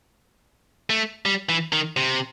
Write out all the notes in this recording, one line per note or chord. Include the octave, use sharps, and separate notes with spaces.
A3
G3
E3
D#3
C3